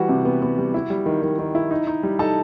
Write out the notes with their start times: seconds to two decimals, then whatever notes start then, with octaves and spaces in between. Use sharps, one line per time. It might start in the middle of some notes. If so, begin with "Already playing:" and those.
Already playing: E3 G3 F#4 F#5
0.09 C3
0.25 B3
0.42 B3
0.58 G3
0.74 E4
0.90 G3
1.06 D#3
1.22 D#3
1.39 D#3
1.55 E4
1.71 D#4
1.87 D#4
2.03 G3
2.19 D#4 A4 A5